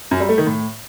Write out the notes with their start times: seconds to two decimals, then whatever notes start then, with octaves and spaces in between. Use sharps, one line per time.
0.11 F#2
0.20 G3
0.29 A3
0.38 D#3
0.47 A2